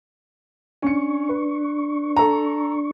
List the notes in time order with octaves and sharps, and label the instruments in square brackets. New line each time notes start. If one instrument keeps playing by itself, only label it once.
[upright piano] C#4 C#7 [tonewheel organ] D4 C#6
[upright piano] B4
A4 A#5